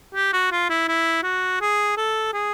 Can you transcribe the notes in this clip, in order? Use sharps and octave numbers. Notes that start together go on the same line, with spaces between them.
G4
F#4
F4
E4
E4
F#4
G#4
A4
G#4